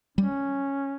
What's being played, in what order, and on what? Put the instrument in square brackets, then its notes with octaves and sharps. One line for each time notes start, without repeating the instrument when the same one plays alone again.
[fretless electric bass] G3 [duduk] C#4